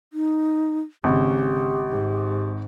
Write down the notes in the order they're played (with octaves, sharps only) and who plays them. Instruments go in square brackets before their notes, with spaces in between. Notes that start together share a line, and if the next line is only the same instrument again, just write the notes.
[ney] D#4
[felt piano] G#1 [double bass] C#3 [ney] G4
[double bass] G#2